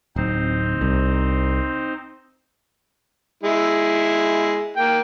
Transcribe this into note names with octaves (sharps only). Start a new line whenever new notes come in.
D1 C4 D#4 C5
C2
G#3 E4
A#3 G5